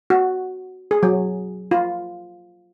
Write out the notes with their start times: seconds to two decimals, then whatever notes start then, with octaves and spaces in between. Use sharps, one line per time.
0.10 F#4
0.91 G#4
1.03 F#3
1.71 F4